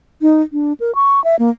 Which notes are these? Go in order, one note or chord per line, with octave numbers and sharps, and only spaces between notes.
D#4
D4
A#4
C#6
E5
A#3